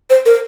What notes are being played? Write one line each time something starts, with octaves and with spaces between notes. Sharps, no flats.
C5
A#4